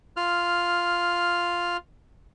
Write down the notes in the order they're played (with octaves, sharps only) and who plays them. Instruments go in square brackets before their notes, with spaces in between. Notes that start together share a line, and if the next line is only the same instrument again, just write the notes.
[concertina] F4 F6